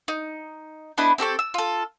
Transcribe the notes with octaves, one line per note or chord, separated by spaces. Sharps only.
D#4
B3 D4 E4 D#5
C4 G4 A4 C#6
E6
F4 A4